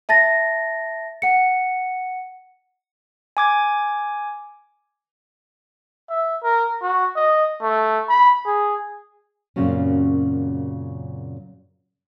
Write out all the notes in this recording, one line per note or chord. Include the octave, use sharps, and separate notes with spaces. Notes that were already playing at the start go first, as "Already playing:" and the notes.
E5 A5 A6 A#6
F#5 C#7
G#5 D6 G#6
E5
A#4
F#4
D#5
A3
B5
G#4
F#2 A#2 C#3 F#3 C4 C#4